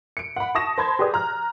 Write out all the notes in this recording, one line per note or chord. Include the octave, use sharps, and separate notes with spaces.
C#7 D7
F#5 B5
A5 C#6 D#6 A#6 E7
C5 A5 B5 G#6
G4 G#4 B4 D5 D#6
A#5 F6 F#6